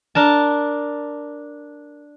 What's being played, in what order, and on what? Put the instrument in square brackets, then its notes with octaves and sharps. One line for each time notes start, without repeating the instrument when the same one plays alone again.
[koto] D4 A#4 A5